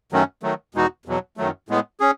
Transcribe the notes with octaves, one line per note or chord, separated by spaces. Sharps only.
F#2 D#3 F#3 A3 C#4
D#3 F#3 A3
E2 B2 G#3 D#4 F#4
E2 B2 F#3
F#2 D#3 F#3 A3
A2 G#3 B3
C#4 G#4